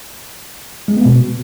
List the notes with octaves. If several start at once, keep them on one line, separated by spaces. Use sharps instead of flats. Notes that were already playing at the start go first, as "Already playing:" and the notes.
G#3
B3
B2